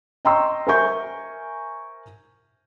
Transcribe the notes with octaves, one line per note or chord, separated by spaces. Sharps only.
D#5 G5 A#5 C6 C#6 E6
A#4 C5 E5 G#5 C#6 G6